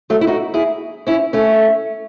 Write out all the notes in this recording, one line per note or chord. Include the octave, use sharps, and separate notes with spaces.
F#3 A3
E4
D#4 F#4
E4 G#4
C#4 E4
A3 C#4